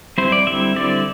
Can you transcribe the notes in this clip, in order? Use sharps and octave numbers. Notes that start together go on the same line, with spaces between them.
G3 C4 E4 C5
D5
D3 G3 C4 E4 E5
D3 G3 C4 E4 D5